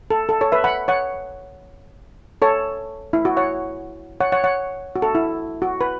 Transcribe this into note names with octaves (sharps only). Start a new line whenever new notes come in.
A4
A4
A4 C#5
B4 E5
F#5 B5
C#5 F#5
A4 C#5
E4
F#4
C#5 F#5
C#5 F#5
C#5 F#5
C#5 F#5
F#4
A4
E4
F#4
B4